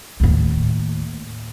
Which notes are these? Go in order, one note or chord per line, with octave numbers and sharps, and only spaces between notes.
D#2 A2